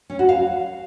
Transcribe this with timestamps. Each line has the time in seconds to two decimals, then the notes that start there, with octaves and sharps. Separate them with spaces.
0.10 C#4
0.19 F#4
0.29 F5